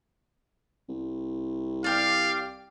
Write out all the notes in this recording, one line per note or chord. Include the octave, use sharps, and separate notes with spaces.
C2
G4 D5 F5